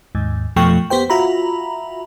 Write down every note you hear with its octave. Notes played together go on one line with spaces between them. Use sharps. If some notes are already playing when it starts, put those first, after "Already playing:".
D#2 G#2
F2 B2 F3 A3 G5 C#6
B3 G4 C5 G5
F4 F#4 E5 A#5 B5